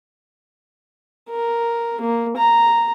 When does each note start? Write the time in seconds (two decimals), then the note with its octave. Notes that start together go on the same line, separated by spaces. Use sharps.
1.30 A#4
2.01 A#3
2.37 A#5